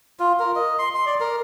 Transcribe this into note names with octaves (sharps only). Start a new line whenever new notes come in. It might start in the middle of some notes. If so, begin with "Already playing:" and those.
F4
A#4
D#5
C6
C6
D5
A#4